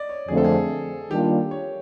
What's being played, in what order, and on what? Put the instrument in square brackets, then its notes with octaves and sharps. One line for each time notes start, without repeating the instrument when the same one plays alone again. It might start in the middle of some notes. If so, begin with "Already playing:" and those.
Already playing: [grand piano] D5 D#5
C#5
[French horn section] F2 D3 F3 A3 C4 [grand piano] G#4
[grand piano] A4
G#4
[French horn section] D#3 G3 A#3 D4 F4 [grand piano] G4
[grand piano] C#5